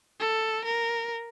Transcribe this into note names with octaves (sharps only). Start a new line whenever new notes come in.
A4
A#4